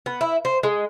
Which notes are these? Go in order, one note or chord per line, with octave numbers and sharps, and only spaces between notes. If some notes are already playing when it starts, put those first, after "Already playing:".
B3
E4
C5
G#3